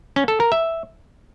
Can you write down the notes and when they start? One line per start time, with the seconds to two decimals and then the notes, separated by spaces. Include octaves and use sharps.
0.16 C#4
0.28 A4
0.40 A#4
0.52 E5